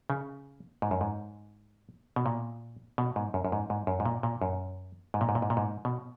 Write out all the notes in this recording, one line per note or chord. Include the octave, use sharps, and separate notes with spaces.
C#3
G#2
F#2
G#2
B2
A#2
B2
G#2
F#2
F#2
G#2
G#2
F#2
G#2
A#2
A#2
F#2
G#2
A#2
G#2
A#2
G#2
A#2
G#2
B2